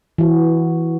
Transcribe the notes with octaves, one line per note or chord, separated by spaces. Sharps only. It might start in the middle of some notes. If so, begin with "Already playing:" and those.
E3 F#4